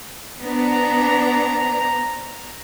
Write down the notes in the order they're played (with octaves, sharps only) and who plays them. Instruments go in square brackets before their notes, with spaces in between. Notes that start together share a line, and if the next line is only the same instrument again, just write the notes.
[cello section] B3 D4 [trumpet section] C5 A#5